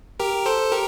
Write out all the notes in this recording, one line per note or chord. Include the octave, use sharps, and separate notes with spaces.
G4 A#4
A4 C5
G4 A#4